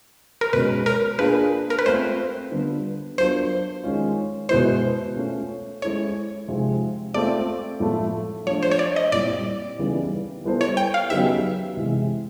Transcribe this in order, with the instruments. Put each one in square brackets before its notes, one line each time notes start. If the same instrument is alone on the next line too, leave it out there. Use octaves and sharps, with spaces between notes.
[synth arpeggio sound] A#4
[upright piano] B2 G#3 C#4 [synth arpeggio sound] B4
[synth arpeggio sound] A#4
[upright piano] A#3 D4 F4 G#4 [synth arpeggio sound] B4
[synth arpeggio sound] A#4
B4
[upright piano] A3 C4 F4 [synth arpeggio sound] C5
[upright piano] D3 G3 B3 D4 F4
[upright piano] F#3 B3 D4 F4 A#4 [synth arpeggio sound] C5
[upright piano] D#3 G#3 C#4 F4
[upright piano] B2 G#3 B3 E4 [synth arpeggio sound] C5
[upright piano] A3 C#4 F4
[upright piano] G#3 C#4 E4 A4 C5 [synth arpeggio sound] C#5
[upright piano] C3 F3 G#3 C4 D#4
[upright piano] A3 C4 F4 [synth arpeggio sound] D5
[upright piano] A2 F3 A3
[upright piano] F3 A3 D4 [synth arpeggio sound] C#5
[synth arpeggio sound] C5
C#5
D5
D#5
[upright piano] A#2 G3 C4 E4 [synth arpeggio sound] D5
[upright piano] C#3 E3 G3 B3 D#4
G3 B3 E4 A4 C5
[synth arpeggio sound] C#5
G5
F5
[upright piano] C#3 F#3 B3 D#4 G4 [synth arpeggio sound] E5
[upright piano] C3 E3 G#3